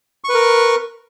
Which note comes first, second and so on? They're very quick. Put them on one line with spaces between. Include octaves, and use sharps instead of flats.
C#6 B4 A#4